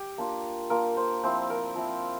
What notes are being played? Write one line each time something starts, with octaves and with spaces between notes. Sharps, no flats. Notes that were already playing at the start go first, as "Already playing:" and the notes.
Already playing: G4
A#3 D4 F4
A#3 D4 F4 A#4
C5
F3 C4 E4 C5
A#4
F3 C4 E4